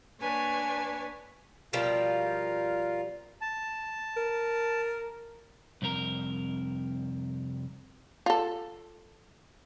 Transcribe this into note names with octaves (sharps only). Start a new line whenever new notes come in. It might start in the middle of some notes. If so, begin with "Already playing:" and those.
A#3 D4 B4 C#5 G#5 A5
B2 F3 G3 F4 A#4 F5
A5
A#4
C2 F2 C4 A#4
F4 A4